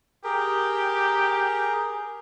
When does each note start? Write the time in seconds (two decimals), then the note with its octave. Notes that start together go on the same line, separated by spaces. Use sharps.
0.24 G4 G#4 A#4